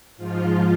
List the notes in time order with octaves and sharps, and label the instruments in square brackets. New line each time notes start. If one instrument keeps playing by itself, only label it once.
[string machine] G#2 F3 F4